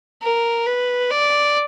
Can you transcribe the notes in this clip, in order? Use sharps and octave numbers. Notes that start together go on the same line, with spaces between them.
A#4
B4
D5